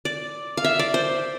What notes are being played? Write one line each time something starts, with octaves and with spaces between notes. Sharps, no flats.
D5
F5
E5
D5
C5